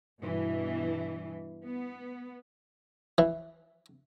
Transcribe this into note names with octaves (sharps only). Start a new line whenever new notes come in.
G2 B2 E3
B3
E3